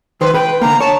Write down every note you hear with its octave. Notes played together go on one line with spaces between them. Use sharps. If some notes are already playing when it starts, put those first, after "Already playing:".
D#3 B4 C5
B4 G5
D3 A#3 A#5
C#5 A5